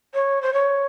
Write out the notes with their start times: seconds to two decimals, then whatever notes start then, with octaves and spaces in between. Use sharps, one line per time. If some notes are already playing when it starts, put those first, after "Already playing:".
0.14 C#5
0.42 C5
0.53 C#5